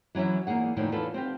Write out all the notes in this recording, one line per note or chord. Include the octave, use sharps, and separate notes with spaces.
E3 F#3 C#4 E4 E5
E2 G#3 A#3 G#4 F#5
E2 A2 D3 D#3 F3 A#3
E2 F4 A4 B4 A5
C4 F4 G4